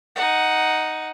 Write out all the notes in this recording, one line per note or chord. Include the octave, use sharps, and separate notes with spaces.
D#4 F#5